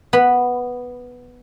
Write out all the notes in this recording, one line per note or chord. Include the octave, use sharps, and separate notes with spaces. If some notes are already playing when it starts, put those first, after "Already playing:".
B3 B5